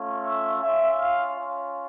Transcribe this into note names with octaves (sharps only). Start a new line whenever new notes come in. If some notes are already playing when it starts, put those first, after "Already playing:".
Already playing: A3 C#4 F4
E5
C#4 F4 E5
F5
C#4 F4